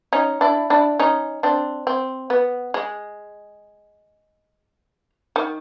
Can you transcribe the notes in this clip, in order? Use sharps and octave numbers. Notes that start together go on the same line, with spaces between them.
C#4 D#4
D4 E4
D4 E4
C#4 D#4
C4 D4
C4
B3
G#3
D#3